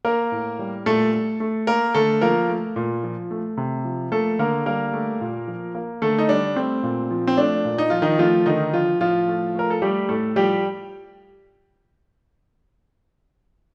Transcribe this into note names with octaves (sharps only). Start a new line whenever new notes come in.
A#3 A#4
A2
G3
A#2 A3 A4
A3
A3
A#3 A#4
D3 A3 A4
F3 A#3 A#4
A3
A#2
F3
A3
C3
F3
A3 A#3 A4
D3 A#3 A#4
G3 A#3 A#4
A3
A#2
F3
A#3
D3 A3 A4
D#4
G3 D4
A3 C4
A#2
F3
C4
A3 D4
A#2
D#4
F3 F4
D#3 D#4
F3 A3 F4
D3 D#3 D#4
F3 F4
A2 F3 F4
A3
A3 A#4
A4
G3 A3 G4
A2 A3 A4
F3 G3 G4